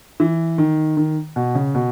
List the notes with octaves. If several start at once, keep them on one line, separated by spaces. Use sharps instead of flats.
E3
D#3
D#3
B2
C#3
B2